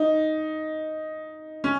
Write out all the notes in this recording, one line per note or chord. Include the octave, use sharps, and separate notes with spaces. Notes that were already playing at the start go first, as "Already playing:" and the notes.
Already playing: D#4
C#4